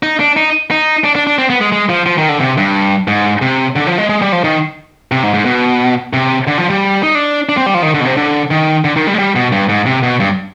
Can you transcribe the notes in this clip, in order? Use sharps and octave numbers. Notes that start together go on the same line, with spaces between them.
D#4
D4
D#4
D#4
D4
D4
D4
C4
B3
G#3
G#3
F3
F3
D#3
D3
C3
G2
G#2
C3
D3
F3
G#3
G#3
G3
F3
D#3
C3
G#2
G#2
B2
C3
D3
F3
G3
D#4
D4
D4
C4
G3
F3
D#3
D3
B2
C3
D3
D#3
D3
D#3
G3
G#3
G3
B2
G2
G#2
C3
B2
G2